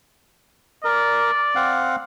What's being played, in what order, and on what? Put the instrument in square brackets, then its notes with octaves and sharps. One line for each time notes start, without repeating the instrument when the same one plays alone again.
[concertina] A#4 [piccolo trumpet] D5
[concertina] C4 F5 F#5